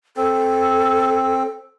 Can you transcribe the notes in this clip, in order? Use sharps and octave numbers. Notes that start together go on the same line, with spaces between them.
C4 A4